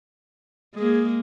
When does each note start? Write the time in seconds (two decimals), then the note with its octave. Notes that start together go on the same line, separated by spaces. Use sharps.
0.75 G#3 A#3 G#4